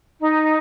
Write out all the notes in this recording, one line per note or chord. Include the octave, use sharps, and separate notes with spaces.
D#4